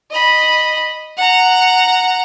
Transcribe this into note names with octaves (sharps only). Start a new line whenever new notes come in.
D#5 B5
F#5 A#5